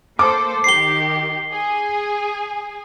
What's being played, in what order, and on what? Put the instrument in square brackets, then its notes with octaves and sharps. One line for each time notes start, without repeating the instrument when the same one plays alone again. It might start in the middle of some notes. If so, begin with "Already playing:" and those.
[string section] A#3 A4 C5 [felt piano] D6
[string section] D#3 G4 [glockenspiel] C7 G7
[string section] G#4 G#5